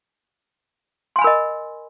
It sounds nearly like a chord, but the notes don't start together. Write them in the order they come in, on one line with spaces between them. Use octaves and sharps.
C6 G#5 B5 A#4 D#5